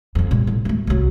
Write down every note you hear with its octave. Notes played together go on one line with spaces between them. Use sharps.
G1 F2
A#2 G3
A2
F#3 A3
C2 F#3